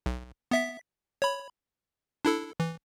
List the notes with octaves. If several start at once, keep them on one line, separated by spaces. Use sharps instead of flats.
B1
B3 E5 B6
C#5 B5
D4 E4 A4
E3